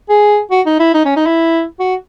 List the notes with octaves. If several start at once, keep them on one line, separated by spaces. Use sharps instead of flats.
G#4
F#4
D#4
E4
D#4
C#4
D#4
E4
F#4